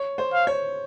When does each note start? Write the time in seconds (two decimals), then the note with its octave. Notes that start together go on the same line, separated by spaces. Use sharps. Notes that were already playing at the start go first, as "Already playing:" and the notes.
Already playing: C#5
0.18 C5
0.33 F5
0.47 C#5